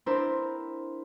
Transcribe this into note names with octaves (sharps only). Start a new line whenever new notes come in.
C4 D4 E4 A#4 C5